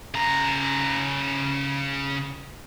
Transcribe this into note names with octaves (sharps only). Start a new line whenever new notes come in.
C#3 A#5